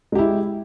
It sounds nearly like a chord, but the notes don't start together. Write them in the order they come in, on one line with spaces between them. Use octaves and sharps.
G#3 G4 E4